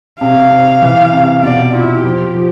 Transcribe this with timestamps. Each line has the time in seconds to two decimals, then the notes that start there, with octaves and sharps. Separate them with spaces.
0.20 C3 F5
0.51 C3
0.82 E3
1.12 C3
1.43 B2 D5
1.73 E4 F4
2.04 F3 G4
2.35 F3